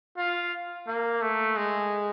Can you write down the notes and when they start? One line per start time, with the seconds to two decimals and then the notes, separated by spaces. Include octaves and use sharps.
0.18 F4
0.87 A#3
1.22 A3
1.57 G#3